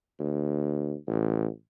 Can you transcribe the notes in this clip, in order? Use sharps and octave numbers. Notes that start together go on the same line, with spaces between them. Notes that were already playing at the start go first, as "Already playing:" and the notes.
D2
A1